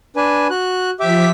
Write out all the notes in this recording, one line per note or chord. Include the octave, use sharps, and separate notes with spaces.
D4 B4 G#5
F#4 F#6
F3 G4 E5 D6 B6